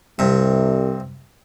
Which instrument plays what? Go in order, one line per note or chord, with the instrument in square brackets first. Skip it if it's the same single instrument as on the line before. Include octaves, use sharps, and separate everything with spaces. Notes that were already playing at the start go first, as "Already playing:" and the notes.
[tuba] C2 [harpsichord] G2 C3